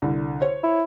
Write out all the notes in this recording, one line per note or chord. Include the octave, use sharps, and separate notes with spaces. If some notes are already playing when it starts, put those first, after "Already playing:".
C2 D3
C5 C#5
E4